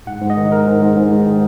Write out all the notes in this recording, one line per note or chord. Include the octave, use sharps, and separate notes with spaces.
G#2 F#5
G#2
D#5
D#3
G#2 A#4
G#2
G#2
G#2
G#2
D#3